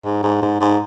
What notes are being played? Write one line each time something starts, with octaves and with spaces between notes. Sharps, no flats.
G#2
G#2
G#2
G#2